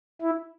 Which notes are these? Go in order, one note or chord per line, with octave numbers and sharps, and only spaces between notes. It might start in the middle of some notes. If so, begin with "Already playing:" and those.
E4